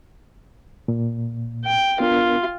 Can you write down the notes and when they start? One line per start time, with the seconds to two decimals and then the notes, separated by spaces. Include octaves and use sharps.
0.88 A#2
1.65 G5
2.00 B3 D4 F4 A#4